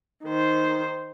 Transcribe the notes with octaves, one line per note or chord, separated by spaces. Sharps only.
D#3 C5